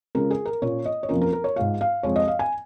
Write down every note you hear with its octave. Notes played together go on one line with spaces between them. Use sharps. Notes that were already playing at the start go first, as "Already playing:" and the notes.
C#3 G#3 C#4 F4 A#4
G#4
A#4
A#2 A#3 C#4 F4 C#5
D#5
C#5
F2 F3 A#3 C#4 F4 A#4
A#4
A#4
C#5
G#2 G#3 F4 F5
F5
F2 F3 G#3 C#5
D#5
F5
G#5